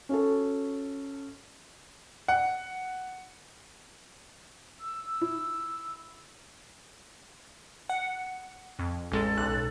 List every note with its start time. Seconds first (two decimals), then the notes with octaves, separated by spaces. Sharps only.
0.09 C#4 F#4 A4
2.28 F#5
4.80 E6
5.21 E4
7.89 F#5
8.79 F2
9.12 A1 G#3 A4
9.37 B1 F#6